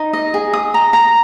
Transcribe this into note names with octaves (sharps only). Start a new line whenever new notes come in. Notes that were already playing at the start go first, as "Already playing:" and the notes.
Already playing: D#4
D#5
G#4
D#6
A#5
A#5